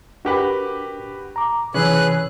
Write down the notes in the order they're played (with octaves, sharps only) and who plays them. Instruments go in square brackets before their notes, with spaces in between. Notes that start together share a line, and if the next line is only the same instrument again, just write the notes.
[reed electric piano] D4 A#4 [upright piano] F#4 G4 B4
[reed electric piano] A#5 D6
[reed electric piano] C3 E3 E6 [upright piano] C#4 [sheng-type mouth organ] G#4 B4 F#6